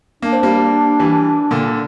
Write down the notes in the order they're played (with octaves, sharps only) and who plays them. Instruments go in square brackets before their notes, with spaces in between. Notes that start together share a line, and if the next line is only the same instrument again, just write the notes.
[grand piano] A#3 [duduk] D4
[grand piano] C4
G3 A#3
E3 G3
A#2 D3